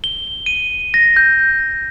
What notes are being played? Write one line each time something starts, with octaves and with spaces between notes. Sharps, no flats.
G7
D#7
A#6
G6